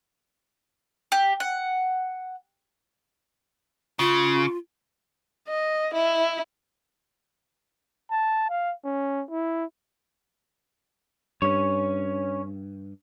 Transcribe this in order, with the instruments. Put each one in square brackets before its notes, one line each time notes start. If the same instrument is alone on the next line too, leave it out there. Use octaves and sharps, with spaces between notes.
[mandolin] G4
F#5
[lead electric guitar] C#3 [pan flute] F4
[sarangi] D#5
E4
[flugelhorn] A5
F5
C#4
E4
[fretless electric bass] G2 [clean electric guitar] C#4 C#5